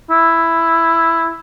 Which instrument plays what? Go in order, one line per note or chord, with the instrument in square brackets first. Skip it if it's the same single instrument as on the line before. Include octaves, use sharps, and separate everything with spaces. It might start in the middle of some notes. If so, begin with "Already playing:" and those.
[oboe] E4